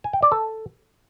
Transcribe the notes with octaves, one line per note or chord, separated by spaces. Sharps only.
G#5
G5
D5
A4